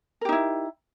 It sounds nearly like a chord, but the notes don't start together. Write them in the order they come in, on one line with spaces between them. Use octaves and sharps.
A#4 G4 D#4 E4